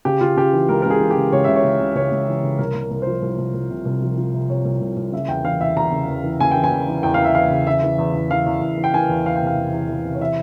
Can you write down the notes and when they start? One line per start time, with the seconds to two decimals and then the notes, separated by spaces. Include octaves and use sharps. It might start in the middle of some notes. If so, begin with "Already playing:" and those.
0.05 C#3 G4
0.21 C#3 F4
0.37 C#3 G4
0.53 E3
0.69 C#2 A#4
0.82 C#2 A#4
0.90 G#4
1.00 E3
1.11 G4
1.17 C#3
1.32 C#2 C#5
1.44 C#2 E5
1.56 C#5
1.64 C#3
1.80 C#2
1.95 C#2 C#5
2.12 C#2
2.28 E3
2.43 C#3
2.58 C2 A#4
2.74 C2
2.91 C2
3.02 F3 C5
3.22 C2
3.38 C2
3.54 C2
3.71 C3
3.85 C2
4.02 F3
4.18 F3
4.34 C3
4.49 C3 C#5
4.65 C2
4.81 C2
4.97 C2
5.12 C#3 E5
5.28 E2 G5
5.45 E3 F5
5.61 E2 E5
5.76 E2 A#5
5.92 C#3
6.08 E2
6.24 E3
6.40 C#3 G#5
6.51 E3 G5
6.64 G#5
6.71 E2
6.88 E3
7.03 E2 G5
7.14 F5
7.20 E2 E5
7.35 E2 F5
7.50 C#3
7.67 E3 E5
7.83 E3
7.98 E2
8.14 E2
8.31 E3 F5
8.46 E2
8.61 E2
8.77 E3
8.84 G5
8.94 E3 G#5
9.09 E2
9.26 E2 F5
9.36 G5
9.42 C3 F5
9.57 E2
9.73 E2
9.89 E3
10.05 C3
10.15 C#5
10.20 E3 E5